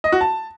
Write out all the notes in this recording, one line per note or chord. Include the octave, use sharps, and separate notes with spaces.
D#5
F#4
A5